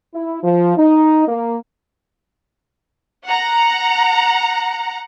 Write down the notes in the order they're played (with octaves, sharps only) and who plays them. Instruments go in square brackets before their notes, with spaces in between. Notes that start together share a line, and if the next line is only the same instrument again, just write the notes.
[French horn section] E4
F3
D#4
A#3
[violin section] F#5 A#5